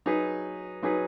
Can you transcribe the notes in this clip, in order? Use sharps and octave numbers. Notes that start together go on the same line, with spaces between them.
F#3 D#4 G#4 B4
F#3 D#4 G#4 B4